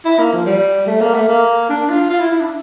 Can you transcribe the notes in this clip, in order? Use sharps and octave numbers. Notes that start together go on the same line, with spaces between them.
E4
A#3
F3
G3
A3
A#3
A3
A#3
D4
F4
F4
E4
E4
D4